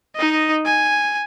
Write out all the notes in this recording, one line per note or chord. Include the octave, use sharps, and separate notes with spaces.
D#4 D#5
G#5